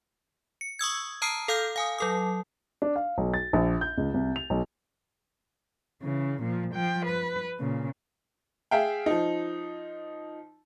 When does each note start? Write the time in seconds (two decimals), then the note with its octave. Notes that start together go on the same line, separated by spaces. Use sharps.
0.61 C#7
0.79 C#6 D#6 E6 G#6
1.22 A5 A#5 D#6 F6 C7
1.48 A4 F5 F6 G6
1.76 F5 G#5 D#6
1.98 F#3 A4 D#6
2.82 D4
2.96 F5
3.18 B1
3.34 A6
3.53 A#1
3.81 G6
3.98 C#2
4.14 C2
4.36 F7
4.50 B1
6.02 C#3 E3
6.43 A#2 F3
6.75 F3 G5
7.06 B4
7.60 A#2 C#3
8.71 G#4 E5 F5 G5
9.06 F3 D#4